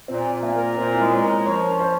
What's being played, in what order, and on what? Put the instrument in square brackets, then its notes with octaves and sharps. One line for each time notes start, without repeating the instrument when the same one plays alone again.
[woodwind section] A#2 [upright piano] C4
[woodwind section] A#2
[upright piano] A#3
[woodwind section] A#4
[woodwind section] A#2 [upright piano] C4
[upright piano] E4
[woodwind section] G#3
[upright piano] C#4
[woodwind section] A#4
[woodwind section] F3 [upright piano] C#5
[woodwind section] C#4
[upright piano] C5